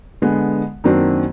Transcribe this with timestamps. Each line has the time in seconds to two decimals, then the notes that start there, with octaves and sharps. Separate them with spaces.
0.22 D3 G#3 B3
0.84 F#2 D#3 F#3 A#3 C4 D4